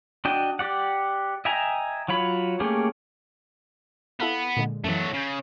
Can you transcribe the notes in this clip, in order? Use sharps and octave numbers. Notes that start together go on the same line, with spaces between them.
D4 F#4 D#5 G5
G4 D5 F#5
D#5 E5 G5 G#5 A#5
F#3 F4 C#5 B5
A3 A#3 C#4 G4 G#4
B3 E4 A4 F5
A#2 D3 G#3
F#2 E3 F#3 A3
C#3 G6 A#6 D#7